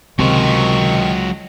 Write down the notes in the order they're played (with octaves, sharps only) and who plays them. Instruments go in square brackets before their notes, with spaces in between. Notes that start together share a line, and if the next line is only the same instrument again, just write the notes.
[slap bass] C#2 [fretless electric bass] C3 [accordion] D#3 C#6 [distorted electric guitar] F#3 C5